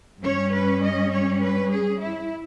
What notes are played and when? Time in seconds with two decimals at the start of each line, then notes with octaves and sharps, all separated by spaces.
0.22 G2 G3 C#4 C#5
0.52 B4
0.82 D#5
1.11 C#5
1.41 B4
1.70 G#4
1.99 E4